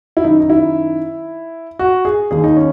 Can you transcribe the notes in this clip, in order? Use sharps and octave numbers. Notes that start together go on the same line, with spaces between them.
E4
F#2 D#3 D#4
D#4
E4
F#4
G#4
D#2 D#3 G#4
D#4
C#4